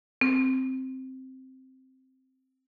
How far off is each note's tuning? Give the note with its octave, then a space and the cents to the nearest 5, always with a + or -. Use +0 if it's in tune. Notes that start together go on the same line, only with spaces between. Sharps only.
C4 +0